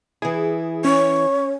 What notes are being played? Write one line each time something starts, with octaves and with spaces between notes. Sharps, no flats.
E3 E4 G#4
C#4 C#5 C#6